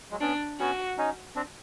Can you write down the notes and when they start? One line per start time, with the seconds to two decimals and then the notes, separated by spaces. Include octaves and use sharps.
0.11 F#3 G#3
0.21 B3 C#4 D4
0.59 B3 C#4 F#4
0.98 C#4 D#4
1.36 C4 D4